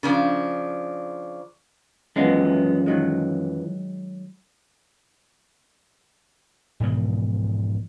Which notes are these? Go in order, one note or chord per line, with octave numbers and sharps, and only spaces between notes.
C#3 F3 D4
F#2 E3 F3 G#3 B3
D#3 F#3 G#3
G#2 B2 E3 F3